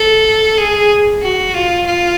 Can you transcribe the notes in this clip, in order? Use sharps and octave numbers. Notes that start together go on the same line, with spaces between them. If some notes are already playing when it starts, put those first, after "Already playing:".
Already playing: A4
G#4
F#4
F4
F4